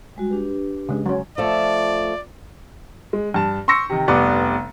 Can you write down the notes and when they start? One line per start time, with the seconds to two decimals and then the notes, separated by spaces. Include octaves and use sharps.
0.16 G3 G#3 F#4
0.30 D4 G4 B4
0.89 C#3 G#3
1.06 F#3 C#4
1.38 F3 A3 D5
3.13 G#3
3.34 G2 A5
3.68 C6 C#6 E6 A#6 C#7
3.89 C3 D#3
4.08 F1 G3 B3 D5 F#5